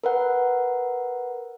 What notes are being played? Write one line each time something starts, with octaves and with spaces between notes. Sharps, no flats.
A#4 B4 F#5